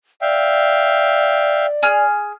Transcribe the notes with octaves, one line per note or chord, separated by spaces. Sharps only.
D5 E5 F5 G5
G#4 F6